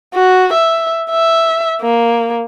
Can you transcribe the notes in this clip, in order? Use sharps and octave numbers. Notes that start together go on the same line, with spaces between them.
F#4
E5
E5
A#3